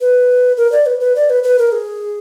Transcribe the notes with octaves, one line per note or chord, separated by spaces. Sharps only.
B4
A#4
D5
B4
B4
D5
B4
B4
A#4
G#4